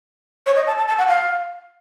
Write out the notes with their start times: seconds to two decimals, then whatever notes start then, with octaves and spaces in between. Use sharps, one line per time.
0.46 C#5
0.56 D#5
0.67 A5
0.77 A5
0.88 A5
0.98 F#5
1.08 F5